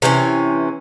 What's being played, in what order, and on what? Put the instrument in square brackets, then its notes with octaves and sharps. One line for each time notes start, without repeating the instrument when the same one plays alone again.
[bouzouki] C3 E3 C4 C#4